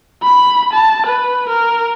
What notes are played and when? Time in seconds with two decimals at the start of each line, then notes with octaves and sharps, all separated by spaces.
0.23 B5
0.72 A5
1.06 B4
1.49 A#4